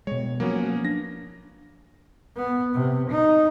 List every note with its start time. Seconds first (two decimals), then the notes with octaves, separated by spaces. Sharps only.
0.07 B2 G#3 C#5
0.40 F3 F#3 A#3 B3 C#4
0.85 D4 A#6
2.36 B3
2.74 C3
3.10 D#4